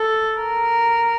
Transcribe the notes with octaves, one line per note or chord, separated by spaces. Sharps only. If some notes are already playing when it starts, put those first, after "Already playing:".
Already playing: A4
A#4